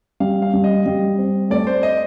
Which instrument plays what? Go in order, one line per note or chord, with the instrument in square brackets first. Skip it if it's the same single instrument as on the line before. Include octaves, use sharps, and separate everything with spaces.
[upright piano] G3 [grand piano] F5
[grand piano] F5
[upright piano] G3
[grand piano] D#5
[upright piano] G3
C4
[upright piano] A3 [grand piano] D5
[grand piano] C5
D#5